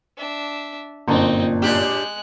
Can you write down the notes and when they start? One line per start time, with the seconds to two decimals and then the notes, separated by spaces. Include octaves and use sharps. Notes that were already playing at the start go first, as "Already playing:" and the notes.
0.18 D4 E5
1.08 G1 F#2 A#2 C4 D#4 A5
1.62 A2 G#3 D4 G4 F#6